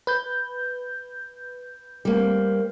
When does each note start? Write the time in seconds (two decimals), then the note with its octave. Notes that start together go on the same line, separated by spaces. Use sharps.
0.07 B4 G6
2.05 G3 A#3 C4